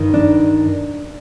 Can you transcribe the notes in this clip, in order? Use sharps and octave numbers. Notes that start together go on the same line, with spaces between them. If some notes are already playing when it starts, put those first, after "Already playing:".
Already playing: G2 D#3
D4